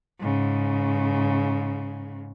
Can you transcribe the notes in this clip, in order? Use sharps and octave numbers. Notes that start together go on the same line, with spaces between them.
G#2 C#3